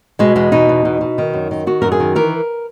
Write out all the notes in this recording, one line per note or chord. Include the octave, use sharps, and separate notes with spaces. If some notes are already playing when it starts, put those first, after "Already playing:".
B2 G#3
E2 G#3
B2 D#4
E2
B2
B2
D#3
F#2
D#3
D#3 F#4
F#2 A#4
G#4
D#3
E3 A#4